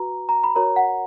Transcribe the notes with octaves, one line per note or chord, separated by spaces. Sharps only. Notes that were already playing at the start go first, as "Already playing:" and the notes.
Already playing: F#4 B4 A#5
A#5
B5
F#4 A#4 C#5 A#5
F#5